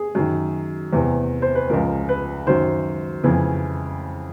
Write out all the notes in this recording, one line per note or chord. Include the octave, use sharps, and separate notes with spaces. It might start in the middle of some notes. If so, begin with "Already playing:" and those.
Already playing: G#4
F#2 D#3
E2 C3 E3
C5
B4
C#2 C#3 F3 A#4
B4
F#2 D#3 C5
F2 C#3 E3